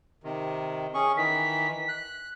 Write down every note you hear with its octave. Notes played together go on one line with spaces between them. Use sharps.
C3 D#3
C#4 G#4 C#6
D#3 E3 B6
F#6